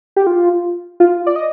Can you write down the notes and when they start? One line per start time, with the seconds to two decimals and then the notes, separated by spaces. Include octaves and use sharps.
0.16 G4
0.27 F4
1.00 F4
1.26 D5
1.36 D#5